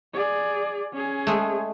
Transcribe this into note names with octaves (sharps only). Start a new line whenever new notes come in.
G#4 D5
C#4 G#4
G#3 A3